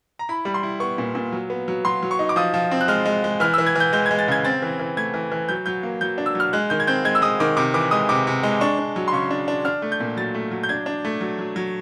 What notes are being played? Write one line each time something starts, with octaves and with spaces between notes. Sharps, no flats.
A#5
E4 B5
G3
C6
E4
B3 C#6
A#2
A#2
F#3
B3
F#3
F#3 C6
F#3
C#6
D#4
D6
F3 D#6
F3
C4
F#6
G#3 F6
G#3
G#3
E3 F6
E6
E3
G#6
E3 G6
G#3 G6
G#6
G#3
A6
C#3 G#6
C4 A6
E3
E3
A3 G#6
E3
E3
F#3 G6
F#3 G6
A#3
F#3 G6
D4
E6
F#3 F6
G#3 F#6
D#3 G6
G#6
C4 G6
G#3 G#6
E6
G#3 D#6
D#3 D6
C3 D6
E3 D6
G#3 D#6
C3 D6
C3
G#3
D4 C#6
D4
F#3
C6
C#3 C#6
D4
D4
D4 F6
A3
G6
A#2
F#3 A6
A3
F#3
G6
D4 G#6
D4
A3
F#3
F#3
F#3